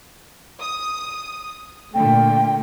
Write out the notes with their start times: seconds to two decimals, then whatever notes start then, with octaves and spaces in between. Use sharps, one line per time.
0.61 D#6
1.94 A#2 D3 A3 G5